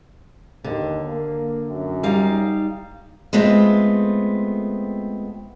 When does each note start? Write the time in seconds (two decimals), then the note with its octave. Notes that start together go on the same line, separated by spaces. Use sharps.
0.64 D#2 D3
1.07 A#3
1.68 F#2
2.03 G3 D#4 F5
3.33 G#3 A3 B3 C4 F4